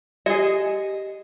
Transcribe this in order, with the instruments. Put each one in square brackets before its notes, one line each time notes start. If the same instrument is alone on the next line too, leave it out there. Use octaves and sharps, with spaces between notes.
[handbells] G4 [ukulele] G#4 D#5